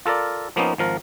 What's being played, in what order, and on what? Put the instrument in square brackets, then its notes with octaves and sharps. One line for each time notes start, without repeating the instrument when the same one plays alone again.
[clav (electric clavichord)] F4 A4 A#4 D5
F3 A#3 B3 C#4 D#4
G#1 F3 A#4